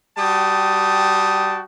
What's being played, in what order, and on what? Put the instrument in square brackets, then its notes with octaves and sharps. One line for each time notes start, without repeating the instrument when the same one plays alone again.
[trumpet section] G3 F#4 G5 A5 D#6